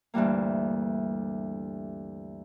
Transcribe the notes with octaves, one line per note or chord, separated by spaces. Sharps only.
D2 G2 E3 G3 A#3